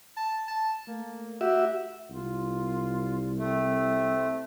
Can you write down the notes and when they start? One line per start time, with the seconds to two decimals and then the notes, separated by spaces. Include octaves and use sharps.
0.17 A5
0.48 A5
0.88 A3 A#3
1.41 F#4 G4 E5
2.10 C2 F4
3.39 A3 C4